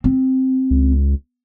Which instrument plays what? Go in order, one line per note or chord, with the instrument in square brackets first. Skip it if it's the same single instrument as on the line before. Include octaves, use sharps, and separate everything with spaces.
[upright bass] C4
[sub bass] C#2